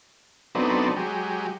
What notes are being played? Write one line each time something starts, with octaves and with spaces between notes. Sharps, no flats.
F#3 A3 B3 C4 D4 D#4
F#3 G#3 G4